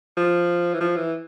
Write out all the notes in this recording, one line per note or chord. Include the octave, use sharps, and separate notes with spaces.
F3
E3
F3
E3